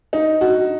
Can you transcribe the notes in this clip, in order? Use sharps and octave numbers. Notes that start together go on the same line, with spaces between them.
D#4
F#4